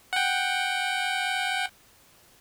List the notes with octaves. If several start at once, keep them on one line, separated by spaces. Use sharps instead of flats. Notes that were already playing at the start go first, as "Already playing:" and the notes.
F#5 G5